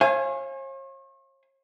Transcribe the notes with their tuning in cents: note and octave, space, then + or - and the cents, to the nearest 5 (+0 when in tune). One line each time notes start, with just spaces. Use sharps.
C#5 -45 F5 -25 G#5 +0